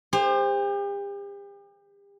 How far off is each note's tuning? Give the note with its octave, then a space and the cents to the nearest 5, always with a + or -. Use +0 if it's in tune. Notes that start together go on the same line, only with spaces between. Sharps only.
G4 +40 C5 +0